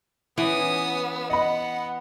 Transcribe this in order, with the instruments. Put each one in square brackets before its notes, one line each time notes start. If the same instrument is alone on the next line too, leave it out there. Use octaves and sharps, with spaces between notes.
[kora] E3 [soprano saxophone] B3 [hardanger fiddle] C#4 D#6
[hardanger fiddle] B3 [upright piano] D#5 B5 [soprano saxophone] F#5